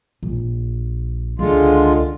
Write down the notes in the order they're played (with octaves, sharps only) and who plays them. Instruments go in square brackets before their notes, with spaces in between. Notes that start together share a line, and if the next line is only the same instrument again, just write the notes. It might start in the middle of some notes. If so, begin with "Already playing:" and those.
[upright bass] A#1
[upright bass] C#2 [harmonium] D3 G#3 F4